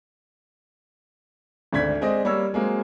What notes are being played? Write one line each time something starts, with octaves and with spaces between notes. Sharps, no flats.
G#1 D2 D4 G#6 B6
G#3 C4 D5 D#5
G3 A#3 C#5 E6
F#3 G#3 A#3 C4